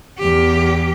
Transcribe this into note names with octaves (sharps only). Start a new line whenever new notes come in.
E2 G4